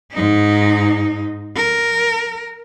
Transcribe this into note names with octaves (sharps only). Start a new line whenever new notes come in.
G#2 D#4
A#4